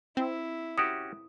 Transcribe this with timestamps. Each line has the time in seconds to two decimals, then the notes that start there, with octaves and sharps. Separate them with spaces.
0.17 C4 E4
0.78 C#4 F#4 G4 D#6